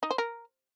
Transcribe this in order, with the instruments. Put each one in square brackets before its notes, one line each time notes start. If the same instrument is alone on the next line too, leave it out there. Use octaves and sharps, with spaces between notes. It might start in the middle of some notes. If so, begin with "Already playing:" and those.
[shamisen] D#4
C5
A#4